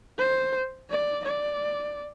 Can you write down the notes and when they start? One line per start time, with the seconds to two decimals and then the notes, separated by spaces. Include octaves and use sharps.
0.18 C5
0.90 D5
1.25 D5